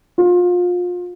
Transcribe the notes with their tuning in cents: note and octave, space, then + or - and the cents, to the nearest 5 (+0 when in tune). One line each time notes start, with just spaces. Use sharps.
F4 +30